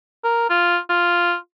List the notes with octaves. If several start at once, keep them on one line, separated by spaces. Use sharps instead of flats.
A#4
F4
F4